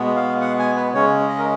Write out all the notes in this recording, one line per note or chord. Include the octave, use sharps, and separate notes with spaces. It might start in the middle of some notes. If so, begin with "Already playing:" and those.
Already playing: B2 G#3 B3
F5
F#5
G#5
B4
C#3 G#3 C#4 C#5
D#5
A#4